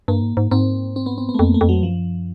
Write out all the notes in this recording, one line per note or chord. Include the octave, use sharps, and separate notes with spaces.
G2 A#3
G#2
G#2
G#2 C4
C4
B3
C4
B3
A3
F2 A#3
A3
F2
F#3
F#2 F3